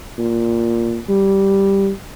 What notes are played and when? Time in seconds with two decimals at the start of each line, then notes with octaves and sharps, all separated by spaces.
0.18 A#2
1.09 G3